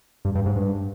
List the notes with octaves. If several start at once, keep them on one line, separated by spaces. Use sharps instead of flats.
G2
G2
G#2
G2